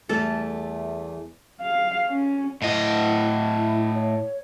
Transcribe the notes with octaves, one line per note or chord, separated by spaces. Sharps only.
E2 E3 G3 A3 A4
F5
C#4
A2 E4 D#5
C#5